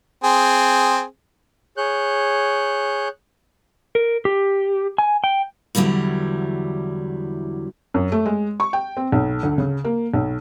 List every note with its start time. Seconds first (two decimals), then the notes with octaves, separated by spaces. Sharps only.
0.24 C4 G#4
1.77 G#4 C#5 F#6 G6
3.95 A#4
4.25 G4
4.98 G#5
5.24 G5
5.75 E2 D3 F#3 G3 E4
7.94 F#2
8.12 A3
8.26 G#3
8.60 C#6
8.73 G5
8.97 C4
9.12 B1
9.43 D2
9.58 C#3
9.84 A#3
10.14 B1